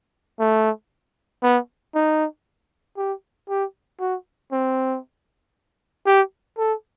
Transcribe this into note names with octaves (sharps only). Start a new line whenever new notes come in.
A3
B3
D#4
G4
G4
F#4
C4
G4
A4